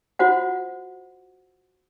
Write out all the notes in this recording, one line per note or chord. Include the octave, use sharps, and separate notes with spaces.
F4 F#4 C5 F#5